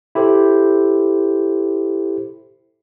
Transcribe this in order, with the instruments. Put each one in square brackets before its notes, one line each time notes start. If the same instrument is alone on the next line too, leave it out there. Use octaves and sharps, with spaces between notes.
[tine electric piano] E4 G4 A4 C5